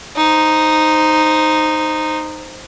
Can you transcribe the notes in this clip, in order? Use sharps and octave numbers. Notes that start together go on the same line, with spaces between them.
D#4 C5